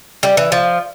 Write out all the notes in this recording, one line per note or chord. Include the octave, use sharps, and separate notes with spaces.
G3
E3
F3